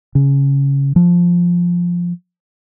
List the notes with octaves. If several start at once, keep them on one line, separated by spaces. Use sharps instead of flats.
C#3
F3